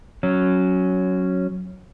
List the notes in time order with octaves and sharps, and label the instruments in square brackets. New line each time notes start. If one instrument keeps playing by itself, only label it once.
[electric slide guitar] F#3 C#4